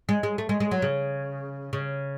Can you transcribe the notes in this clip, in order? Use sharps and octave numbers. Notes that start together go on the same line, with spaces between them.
G#3
G#3
A3
G#3
G#3
F#3
C#3
C#3